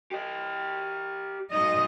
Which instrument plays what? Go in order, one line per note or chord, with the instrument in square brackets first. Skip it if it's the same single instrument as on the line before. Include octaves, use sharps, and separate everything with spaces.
[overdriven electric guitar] G4 D#5
[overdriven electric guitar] F#3 D#4 [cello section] D#5